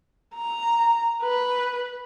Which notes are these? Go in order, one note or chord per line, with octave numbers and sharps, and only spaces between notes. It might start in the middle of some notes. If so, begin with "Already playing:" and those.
A#5
B4